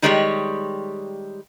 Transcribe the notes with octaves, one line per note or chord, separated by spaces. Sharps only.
D#3 G3 G#3 G4 C5 C#5